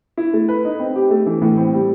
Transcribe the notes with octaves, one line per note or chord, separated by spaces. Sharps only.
E4
A3
B4
D#4
C4
G4
A3
E3
A2
C4
G3